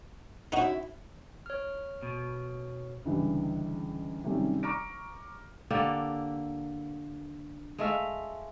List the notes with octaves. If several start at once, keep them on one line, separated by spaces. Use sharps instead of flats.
F#2 D#4 E4 F#4
C#5 F6
B2
C#2 D3 E3 G3
C3 D#3 F#3 G3 A3 C#4
A#5 C#6 D6 F6 A#6 D7
D3 A#3 G4 A4
G#3 A3 E5 F5